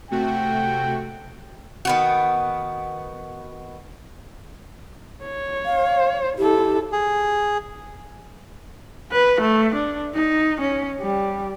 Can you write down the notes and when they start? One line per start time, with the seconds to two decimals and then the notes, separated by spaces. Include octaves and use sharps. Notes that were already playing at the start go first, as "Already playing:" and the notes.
0.11 C3 A3 F#4 G5
1.85 D#3 B3 F#4
5.23 C#5
5.65 F5
6.38 E4 G4 A4
6.92 G#4
9.12 B4
9.41 A3
9.75 D4
10.14 D#4
10.61 C#4
11.01 G3